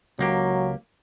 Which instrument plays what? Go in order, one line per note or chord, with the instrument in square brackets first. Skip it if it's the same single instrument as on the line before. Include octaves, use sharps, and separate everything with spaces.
[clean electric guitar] C#2 A#3 G4 [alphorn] F#3